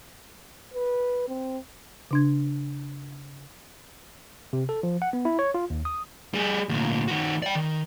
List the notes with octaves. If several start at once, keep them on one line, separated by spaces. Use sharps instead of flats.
B4
C4
C#3 D4 G#6
C3
A4
F3
F#5
B3
E4
C#5
F4
D#2
D#6
G3 G#4
D2 A#2
D#3 F#4
D5 G5
D#3